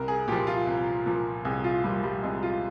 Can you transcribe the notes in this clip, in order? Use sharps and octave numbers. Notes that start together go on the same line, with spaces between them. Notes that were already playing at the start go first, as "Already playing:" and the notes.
Already playing: C2 A#4
G#4
A#2 F3 G4
F4
C2
A#2 F3
C2 G#4
F4
A#2 F3 G3
G3
C2 G#3
F4